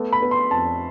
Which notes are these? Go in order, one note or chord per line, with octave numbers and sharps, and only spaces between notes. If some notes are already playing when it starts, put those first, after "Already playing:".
Already playing: A3 B3
B5
B3
C6
F2 A5